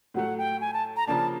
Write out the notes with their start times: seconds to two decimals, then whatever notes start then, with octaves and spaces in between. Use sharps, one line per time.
0.14 A2 F#3 A3 F#5
0.38 G5
0.61 G#5
0.73 A5
0.96 A#5
1.07 C#3 F3 A#3 D4 A5